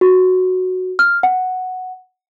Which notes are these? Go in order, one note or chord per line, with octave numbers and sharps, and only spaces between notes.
F#4
F6
F#5